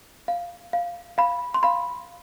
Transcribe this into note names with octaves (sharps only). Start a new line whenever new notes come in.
F5
F5
F5 B5
C6
F5 B5